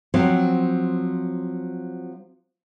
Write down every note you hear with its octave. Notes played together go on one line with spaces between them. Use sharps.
F3 F#3 C4